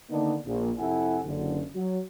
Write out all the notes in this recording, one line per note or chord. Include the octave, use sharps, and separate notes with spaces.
D3 D#3 A#3 B3 D4 D#4
A#1
F2 C3 E4 A4 F#5 G#5
F#1 D3
F#3